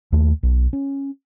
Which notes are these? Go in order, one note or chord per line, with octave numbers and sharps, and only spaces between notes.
D#2 A3
B1
C#4